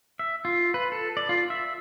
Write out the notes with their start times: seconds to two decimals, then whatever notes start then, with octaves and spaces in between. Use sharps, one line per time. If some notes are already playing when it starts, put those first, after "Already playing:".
0.19 E5
0.45 F4
0.74 B4
0.92 A4
1.17 D5
1.29 F4
1.50 E5